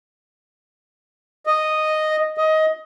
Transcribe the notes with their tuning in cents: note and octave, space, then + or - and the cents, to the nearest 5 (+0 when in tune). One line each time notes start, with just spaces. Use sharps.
D#5 -5
D#5 +15